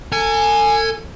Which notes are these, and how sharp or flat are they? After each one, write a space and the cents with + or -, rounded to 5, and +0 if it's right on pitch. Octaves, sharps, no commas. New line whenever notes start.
A4 +35 G#5 +0